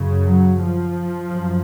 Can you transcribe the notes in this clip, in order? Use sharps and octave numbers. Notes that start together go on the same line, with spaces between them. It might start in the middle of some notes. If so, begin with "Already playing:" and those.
Already playing: F#2 C#3
F#3
F3
F#2